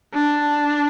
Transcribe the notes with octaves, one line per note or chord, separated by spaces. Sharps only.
D4